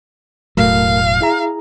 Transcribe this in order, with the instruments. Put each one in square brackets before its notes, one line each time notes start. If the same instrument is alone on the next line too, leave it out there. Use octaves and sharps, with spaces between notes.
[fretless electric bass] E1 A2 F#3 [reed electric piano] A3 A#4 [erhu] F5
[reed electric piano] E4 G#4 A#5